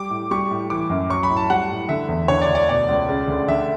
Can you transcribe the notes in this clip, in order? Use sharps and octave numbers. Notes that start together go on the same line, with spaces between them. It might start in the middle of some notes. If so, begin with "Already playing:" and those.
Already playing: G3 D6
A2
G3 C#6
A2
E3 D6
F#2
F#3 C#6
B5
A2
A5
G3 F#5
A2
D3 E5
E2
D3 C#5
D5
D2
D5
B2 D5
C#2
C#3
D2
D3 E5